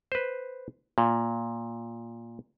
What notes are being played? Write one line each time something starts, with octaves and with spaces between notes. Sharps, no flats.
B4 C5
A#2